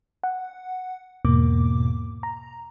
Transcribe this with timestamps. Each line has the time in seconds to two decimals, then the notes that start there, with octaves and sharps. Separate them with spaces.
0.24 F#5
1.25 E2 G#2 B2 A#3 D6
2.23 A#5